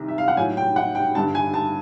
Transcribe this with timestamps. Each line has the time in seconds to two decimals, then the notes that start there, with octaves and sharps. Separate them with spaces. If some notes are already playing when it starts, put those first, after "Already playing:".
Already playing: C2 C3 D#3
0.08 E5
0.18 F5
0.28 F#5
0.37 A2 F#3 G#5
0.57 G5
0.76 F#5
0.95 G5
1.15 G2 D3 G3 A5
1.35 G#5
1.54 A5